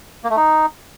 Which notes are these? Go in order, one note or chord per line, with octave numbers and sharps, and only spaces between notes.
A#3
A3
D#4